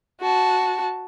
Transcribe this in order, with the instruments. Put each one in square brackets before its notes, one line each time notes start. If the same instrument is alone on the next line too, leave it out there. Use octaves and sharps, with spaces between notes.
[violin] F#4 A5